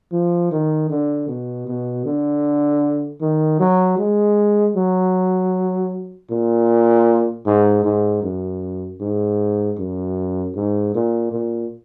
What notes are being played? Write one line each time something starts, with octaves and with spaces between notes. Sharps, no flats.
F3
D#3
D3
B2
B2
D3
D#3
F#3
G#3
F#3
A#2
G#2
G#2
F#2
G#2
F#2
G#2
A#2
A#2